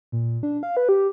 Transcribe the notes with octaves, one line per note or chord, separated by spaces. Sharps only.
A#2
D4
F5
B4
G4